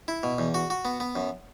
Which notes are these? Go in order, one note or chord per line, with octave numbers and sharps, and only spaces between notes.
E4
B2
E2
F#4
F#4
B3
B3
F#2